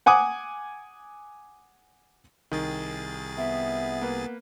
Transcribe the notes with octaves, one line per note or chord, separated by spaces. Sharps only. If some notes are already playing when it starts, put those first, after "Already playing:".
F#5 G#5 D6 D#6
C2 D#3 G#4 A6
B3 E5
A#3 B4